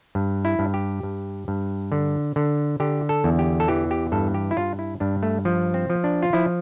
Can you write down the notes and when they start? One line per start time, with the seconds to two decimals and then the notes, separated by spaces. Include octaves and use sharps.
0.15 G2
0.45 E4
0.59 G2
0.74 G4
1.03 G2
1.48 G2
1.92 D3
2.36 D3
2.80 D3 G4
3.09 A4
3.24 E2
3.39 G4
3.60 A4
3.68 E3 G4
3.91 G4
4.12 G2 A4
4.34 G4
4.51 E4
4.57 G2 F4
4.79 E4
5.00 G2 D4
5.23 A3
5.45 F3
5.74 C4
5.90 F3
6.04 D4
6.22 F4
6.33 F3 E4